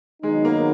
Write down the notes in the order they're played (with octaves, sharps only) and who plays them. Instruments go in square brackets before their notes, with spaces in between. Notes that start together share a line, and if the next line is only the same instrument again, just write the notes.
[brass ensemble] D#3 F#3 B3 D#4 [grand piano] G#3
[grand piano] A#3